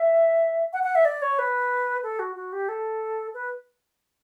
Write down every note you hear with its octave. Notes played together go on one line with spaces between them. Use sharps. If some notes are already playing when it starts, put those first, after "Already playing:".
Already playing: E5
F#5
F#5
E5
D5
C#5
B4
A4
F#4
F#4
G4
A4
B4